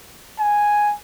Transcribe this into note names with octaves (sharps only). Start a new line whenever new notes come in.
G#5